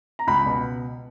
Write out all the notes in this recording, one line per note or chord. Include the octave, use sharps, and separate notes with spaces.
A#5
C#2 B5
B2